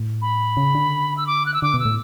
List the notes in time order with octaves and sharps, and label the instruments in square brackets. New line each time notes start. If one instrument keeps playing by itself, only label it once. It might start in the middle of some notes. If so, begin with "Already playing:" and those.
Already playing: [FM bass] A2
[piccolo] B5
[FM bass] C#3
D3
[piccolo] E6
D6
F#6
E6
[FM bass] D3 [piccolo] D6
[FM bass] B2
[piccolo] E6
[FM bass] A2